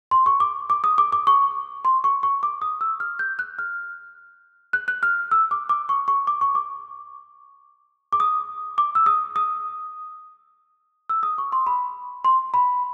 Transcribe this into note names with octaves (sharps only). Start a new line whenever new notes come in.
C6
C#6
D6
D6
D#6
D6
D6
C#6
C6
C#6
C#6
D6
D#6
E6
F6
G6
F#6
F6
F#6
F#6
F6
E6
D6
D6
C#6
C#6
D6
C#6
D6
D6
D#6
D6
E6
D#6
D#6
E6
D#6
C#6
C6
B5
C6
B5